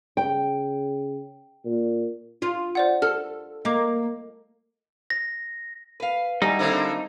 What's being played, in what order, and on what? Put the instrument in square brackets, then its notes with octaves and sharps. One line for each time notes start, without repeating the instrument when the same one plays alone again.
[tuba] C#3 [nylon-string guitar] G5
[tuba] A#2
[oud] F4
[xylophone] C5 D5 F#5
[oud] A4 [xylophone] F6
[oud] A#3 [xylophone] D#5 D6
[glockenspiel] A#6
[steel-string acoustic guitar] B4 F5
[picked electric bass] G3 [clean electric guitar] D#4 [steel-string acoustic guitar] E4 F#4 G#4
[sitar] D3 A#3 E4 [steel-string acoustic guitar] C4 C5 F5